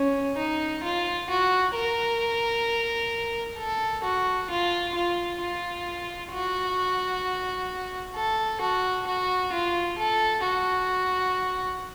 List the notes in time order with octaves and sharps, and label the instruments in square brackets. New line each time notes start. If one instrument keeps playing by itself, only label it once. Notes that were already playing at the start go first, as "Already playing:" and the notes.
Already playing: [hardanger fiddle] C#4
D#4
F4
F#4
A#4
A4
F#4
F4
F4
F4
F#4
A4
F#4
F#4
F4
A4
F#4